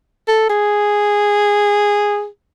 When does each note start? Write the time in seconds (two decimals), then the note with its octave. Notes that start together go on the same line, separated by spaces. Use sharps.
0.28 A4
0.50 G#4